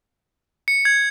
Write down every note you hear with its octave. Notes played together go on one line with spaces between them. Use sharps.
C#7
G#6